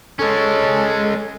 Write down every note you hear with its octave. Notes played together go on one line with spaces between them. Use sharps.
G#3 C#4 A4